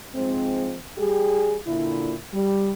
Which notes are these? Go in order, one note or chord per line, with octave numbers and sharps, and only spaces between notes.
G#2 F3 G#3 C4
G3 G4 G#4
A#2 D3 E4
G3